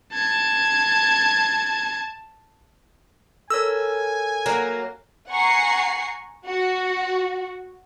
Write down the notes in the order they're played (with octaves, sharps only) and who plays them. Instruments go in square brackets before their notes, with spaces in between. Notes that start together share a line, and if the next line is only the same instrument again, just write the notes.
[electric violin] A5 G#6
[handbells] A4 A#4 C#5 [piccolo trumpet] G#5 [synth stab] E6
[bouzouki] F#3 A#3
[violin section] F#5 G#5 A#5 C#6 C7
F#4